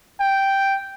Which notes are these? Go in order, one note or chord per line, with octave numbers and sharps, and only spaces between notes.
G5